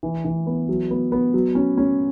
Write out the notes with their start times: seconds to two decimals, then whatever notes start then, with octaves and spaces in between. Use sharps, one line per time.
0.03 E3
0.25 E3
0.47 B3
0.69 F#3
0.91 B3
1.12 B3
1.34 F#3
1.55 C#4
1.77 C#4